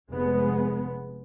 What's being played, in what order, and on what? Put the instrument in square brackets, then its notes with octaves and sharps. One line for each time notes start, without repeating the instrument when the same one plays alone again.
[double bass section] F1 G#3 B3